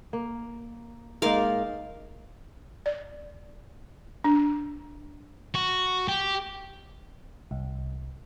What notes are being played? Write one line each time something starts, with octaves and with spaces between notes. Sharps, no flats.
A#3
G#2 A#3 D#4 A#4 D5 F5
D5
D4
F#4
G4
C2